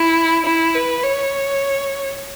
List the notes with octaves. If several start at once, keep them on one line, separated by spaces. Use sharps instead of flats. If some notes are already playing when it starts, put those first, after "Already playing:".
Already playing: E4
E4
B4
C#5